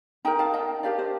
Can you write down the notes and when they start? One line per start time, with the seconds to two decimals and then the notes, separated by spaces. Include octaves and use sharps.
0.25 D#4 A#4 G5 A#5
0.39 F5 A5
0.54 D#5 G5
0.83 D4 G4 A#4 D5 F5
0.99 C5 D#5